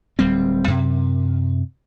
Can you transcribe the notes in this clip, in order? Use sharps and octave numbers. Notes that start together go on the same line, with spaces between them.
D1 G3 C4
F#2 C3